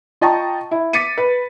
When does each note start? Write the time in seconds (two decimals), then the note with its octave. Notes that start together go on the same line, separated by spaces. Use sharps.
0.21 F4 D#5 G5 A5 A#5 C#6
0.71 E4
0.93 D6 A6 B6 C#7 D#7
1.18 B4